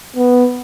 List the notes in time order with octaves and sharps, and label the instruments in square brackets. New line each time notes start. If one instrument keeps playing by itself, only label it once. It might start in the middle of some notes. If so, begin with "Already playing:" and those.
[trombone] B3